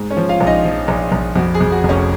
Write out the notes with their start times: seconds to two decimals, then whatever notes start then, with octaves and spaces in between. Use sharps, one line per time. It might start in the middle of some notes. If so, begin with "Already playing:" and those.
Already playing: G#2
0.11 C#4 C#5
0.17 F3
0.29 F4 F5
0.41 A#1
0.47 D#4 D#5
0.65 F3
0.88 A#1
1.12 A#1
1.36 F2 F#4
1.55 G#4
1.61 F2
1.72 F#4
1.84 F1
1.89 C#4 C#5